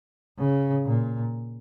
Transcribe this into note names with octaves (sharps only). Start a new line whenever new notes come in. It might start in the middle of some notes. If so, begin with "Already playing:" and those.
C#3
A#2